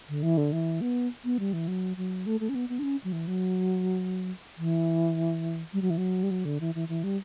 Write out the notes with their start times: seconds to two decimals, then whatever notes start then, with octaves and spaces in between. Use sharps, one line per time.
0.09 D3
0.23 E3
0.37 D3
0.53 E3
0.81 B3
1.25 B3
1.40 G3
1.53 E3
1.68 F#3
1.97 F#3
2.26 A3
2.40 A3
2.49 C#4
2.55 B3
2.69 B3
2.79 D4
2.83 C#4
3.04 F#3
3.13 E3
3.27 F#3
4.58 E3
5.73 G3
5.82 F#3
5.90 E3
5.98 F#3
6.23 G3
6.31 F#3
6.45 D3
6.60 E3
6.75 E3
6.89 E3
7.04 G3